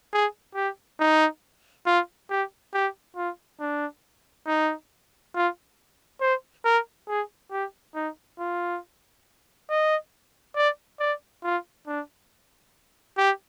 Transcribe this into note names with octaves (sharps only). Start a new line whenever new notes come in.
G#4
G4
D#4
F4
G4
G4
F4
D4
D#4
F4
C5
A#4
G#4
G4
D#4
F4
D#5
D5
D5
F4
D4
G4